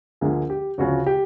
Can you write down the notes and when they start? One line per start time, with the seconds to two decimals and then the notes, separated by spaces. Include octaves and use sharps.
0.21 D2 D3 F3 A#3 G#4
0.50 G4
0.78 D2 C#3 F3 F#4
1.06 G4